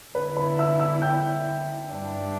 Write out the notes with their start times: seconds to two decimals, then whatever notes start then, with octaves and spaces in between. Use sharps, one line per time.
0.15 D3 B3 E4 B4
0.37 B4 B5
0.58 E5 E6
0.80 E5 E6
1.02 G5 G6
1.88 G2 G3 D4